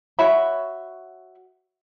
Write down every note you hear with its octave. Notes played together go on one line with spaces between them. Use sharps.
F#4 C#5 E5 B5